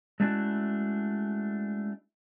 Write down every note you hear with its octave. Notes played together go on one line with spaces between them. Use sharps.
G#3 A3 C#4 D4 E4 F#4